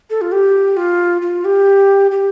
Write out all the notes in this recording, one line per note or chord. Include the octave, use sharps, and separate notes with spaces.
A4
F4
G4
F4
F4
G4
G4